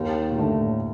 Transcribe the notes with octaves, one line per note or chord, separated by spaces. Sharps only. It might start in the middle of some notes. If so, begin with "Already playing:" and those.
Already playing: D#2 D#3
A#2
A2 D3 A3